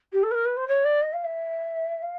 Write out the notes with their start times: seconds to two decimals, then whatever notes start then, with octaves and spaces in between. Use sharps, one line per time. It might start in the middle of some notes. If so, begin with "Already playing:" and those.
0.12 G4
0.23 A4
0.31 B4
0.34 A#4
0.45 B4
0.56 C5
0.67 C#5
0.84 D5
1.01 D#5
1.13 F5
1.24 E5
2.02 F5